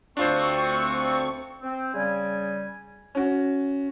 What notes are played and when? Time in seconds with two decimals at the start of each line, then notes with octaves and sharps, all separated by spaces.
0.17 D2 C4 D4 F4 C5 C#6
1.62 C4
1.94 C#3 G3 G#5
3.15 C#4 F#4